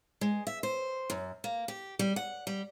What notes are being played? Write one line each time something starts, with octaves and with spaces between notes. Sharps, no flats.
G#3
E5
C5
F#2
A#3
G4
G3
F#5
G3